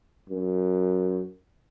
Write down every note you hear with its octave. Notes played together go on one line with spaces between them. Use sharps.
F#2